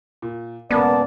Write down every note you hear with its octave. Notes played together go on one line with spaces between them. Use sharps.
A#2
E1 C#3 A#3 B3 D5 A5